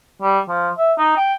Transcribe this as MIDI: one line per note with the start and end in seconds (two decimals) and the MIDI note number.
0.22 0.40 55
0.48 0.69 53
0.78 0.93 76
0.98 1.14 63
1.17 1.34 79